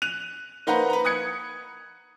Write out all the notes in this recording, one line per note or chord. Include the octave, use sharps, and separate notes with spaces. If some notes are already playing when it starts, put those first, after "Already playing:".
F#6 D#7 F7
A#3 D#4 B4 C5 F#5 A#5
B4 A#5
D#6 F#6 G#6 C#7